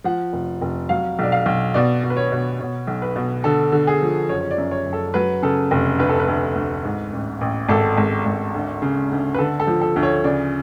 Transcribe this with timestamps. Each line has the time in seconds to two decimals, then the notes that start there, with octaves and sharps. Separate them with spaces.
0.04 F3 F#5
0.33 F1
0.61 F1
0.89 F#3 F5
1.19 B1 D5
1.32 F5
1.46 B1
1.74 B2 D5
2.04 B2
2.10 B4
2.17 C#5
2.32 B2
2.60 B2 C#5
2.87 B1
3.02 B4
3.16 B2
3.44 D3 A4
3.72 D3
3.87 G#4
4.02 F3
4.29 F#1 C#5
4.41 C#5
4.51 D5
4.58 F#2
4.71 C#5
4.87 F#1
4.93 A4
5.14 F#3 B4
5.42 C#3 A4
5.71 F1
5.99 D2 B4
6.09 A4
6.20 B4
6.28 D2
6.55 D2
6.85 G#2
7.13 A1
7.41 A1
7.69 G#1 A4
7.98 G#1
8.25 G#1
8.54 D2
8.82 C#3
9.11 D2
9.34 B4
9.38 D3 A4
9.60 A4
9.67 F3
9.81 A4
9.96 D2
10.03 C#5
10.24 C#3 D5